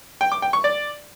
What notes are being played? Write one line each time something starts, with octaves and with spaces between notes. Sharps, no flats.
G5
D6
G5
C#6
D5